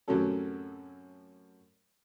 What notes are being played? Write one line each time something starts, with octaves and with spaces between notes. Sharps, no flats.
F#2 A2 C3 F#3 C#4 A4